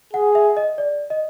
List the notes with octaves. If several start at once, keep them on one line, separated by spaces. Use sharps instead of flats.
G#4 F#5
E5
D#5
D5
D#5